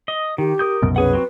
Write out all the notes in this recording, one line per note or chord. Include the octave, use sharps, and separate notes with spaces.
D#5
D#3 G4
A#4 D#6 G6
C2 F#2 B2
C#4 G#4 B4 F#5
F#3 C4 F#4